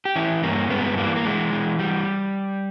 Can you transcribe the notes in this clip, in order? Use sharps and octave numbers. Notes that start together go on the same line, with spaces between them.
G4
E3 C#4 E4
G2 A#3 C#4
G2 G#3 B3
E3 G3 A#3
A#3
E3 G#3
E3
G3